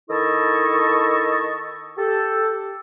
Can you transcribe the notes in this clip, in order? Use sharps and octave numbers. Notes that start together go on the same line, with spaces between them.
D#3 E4 A4 D#5 A5 C#6
G4 A4